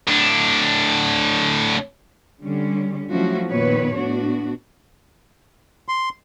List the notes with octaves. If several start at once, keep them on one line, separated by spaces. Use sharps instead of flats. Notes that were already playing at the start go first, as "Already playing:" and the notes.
A2 D4
D3 G3 C#4
F3 F#3 A3 C#4 E4 F#4
F2 A#2 D#3 B3 B4 C#5
A2 B3 D4 F#4
C6